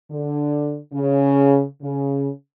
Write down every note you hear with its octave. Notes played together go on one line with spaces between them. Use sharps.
D3
C#3
C#3